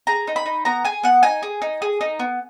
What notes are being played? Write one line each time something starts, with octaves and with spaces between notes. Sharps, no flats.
G#4 A#5
D#4
B5
D#4
B3 A#5
G#4 G#5
B3 F#5
D#4 G#5
G#4
D#4
G#4
D#4
B3